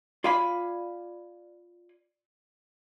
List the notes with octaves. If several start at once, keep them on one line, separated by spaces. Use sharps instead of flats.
F4 D5 F5 G#5 B5